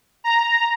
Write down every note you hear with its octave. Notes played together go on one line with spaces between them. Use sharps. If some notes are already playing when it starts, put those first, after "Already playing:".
A#5